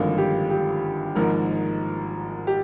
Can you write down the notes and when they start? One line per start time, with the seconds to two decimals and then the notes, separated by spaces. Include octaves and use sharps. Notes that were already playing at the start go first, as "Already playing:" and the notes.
Already playing: G#1 G2 D3 F3 A#3 F4
0.18 G4
0.50 G4
1.15 G#1 G#2 F3 A#3 A#4
2.47 G4